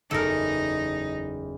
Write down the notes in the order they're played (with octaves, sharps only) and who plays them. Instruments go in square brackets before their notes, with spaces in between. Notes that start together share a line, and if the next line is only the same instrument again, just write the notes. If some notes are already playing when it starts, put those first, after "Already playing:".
[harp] F#1 E2 [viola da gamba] D#4 [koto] A4 A#4